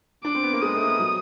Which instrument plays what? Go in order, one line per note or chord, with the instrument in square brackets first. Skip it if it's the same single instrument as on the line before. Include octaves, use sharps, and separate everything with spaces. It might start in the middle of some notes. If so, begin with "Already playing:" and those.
[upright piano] D4 [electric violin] D6
[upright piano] C4
B3
A#3
[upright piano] G#3 [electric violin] D#6
[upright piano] A3
A#3
B3
F#3